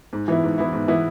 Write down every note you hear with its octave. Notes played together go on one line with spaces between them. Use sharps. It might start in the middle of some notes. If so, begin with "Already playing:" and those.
G#2
E3 B3 E4
G#2
E3 B3 E4
G#2
E3 B3 E4